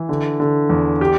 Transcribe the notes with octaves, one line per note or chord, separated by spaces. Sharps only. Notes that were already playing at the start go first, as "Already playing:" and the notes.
Already playing: E3
D3
D3
E2
G4